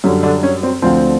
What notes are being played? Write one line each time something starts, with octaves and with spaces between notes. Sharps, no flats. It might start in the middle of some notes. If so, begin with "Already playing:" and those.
F#2 D3 G3 C#4
D3 D4
C#4
C4
D2 D3 F3 C4